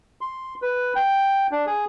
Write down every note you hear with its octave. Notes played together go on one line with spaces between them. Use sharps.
C6
B4
G5
D4
G#4